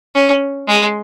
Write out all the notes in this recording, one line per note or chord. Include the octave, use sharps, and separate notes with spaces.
C#4
G#3